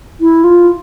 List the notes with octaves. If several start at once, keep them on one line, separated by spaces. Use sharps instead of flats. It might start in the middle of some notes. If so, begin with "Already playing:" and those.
E4
F4